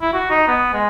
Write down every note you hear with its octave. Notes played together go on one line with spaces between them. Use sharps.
E4
F#4
D#4
B3
G#3